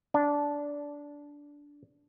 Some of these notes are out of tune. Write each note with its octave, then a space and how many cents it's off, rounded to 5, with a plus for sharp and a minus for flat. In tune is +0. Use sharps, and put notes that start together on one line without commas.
D4 -15